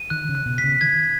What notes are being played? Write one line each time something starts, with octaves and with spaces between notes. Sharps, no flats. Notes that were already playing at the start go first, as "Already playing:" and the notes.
Already playing: D#7
D#3 F#6
C#3
F#6
B2
B6
C#3
D#3 G#6